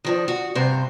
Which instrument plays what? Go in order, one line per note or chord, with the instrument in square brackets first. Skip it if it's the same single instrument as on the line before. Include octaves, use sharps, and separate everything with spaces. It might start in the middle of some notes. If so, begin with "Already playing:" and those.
[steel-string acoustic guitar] D#3 F3 D4
F#4
G2 C3 C5